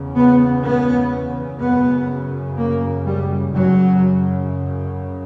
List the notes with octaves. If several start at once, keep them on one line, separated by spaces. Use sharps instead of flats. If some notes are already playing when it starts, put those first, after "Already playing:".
Already playing: E2 C#3
B3
B3
F#2 C#3 B3
A#3
G3
F#2 C#3 F#3